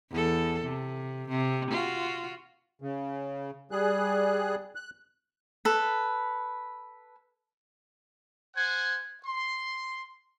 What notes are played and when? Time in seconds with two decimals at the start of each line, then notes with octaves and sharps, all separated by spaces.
0.11 E2 A4
0.64 C3
1.29 C3
1.71 F4 F#4
2.82 C#3
3.71 G3 G#4 F#6
4.75 F#6
5.65 A4 B4
8.56 C5 F#5 G#5
9.24 C6